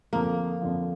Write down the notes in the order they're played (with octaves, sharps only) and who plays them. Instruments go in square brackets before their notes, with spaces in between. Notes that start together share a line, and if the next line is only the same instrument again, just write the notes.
[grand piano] F2 D3 F3 [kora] A#3
[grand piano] F2 D3 F3